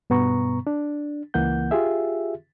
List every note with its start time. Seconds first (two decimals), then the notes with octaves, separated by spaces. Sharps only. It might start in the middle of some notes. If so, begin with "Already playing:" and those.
0.10 G2 B2 B3 A#5 C#6
0.67 D4
1.34 C#2 E3 A#3 F#5 G6
1.71 F4 G4 G#4 E5